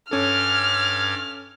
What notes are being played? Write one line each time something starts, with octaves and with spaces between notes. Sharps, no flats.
G2 C#4 A4 D6 F6 G#6